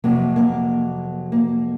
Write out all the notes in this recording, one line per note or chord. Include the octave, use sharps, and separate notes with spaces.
F2 C3 F#3 A#3
A#3
A#3